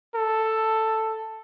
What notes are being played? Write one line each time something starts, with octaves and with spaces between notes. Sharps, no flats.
A4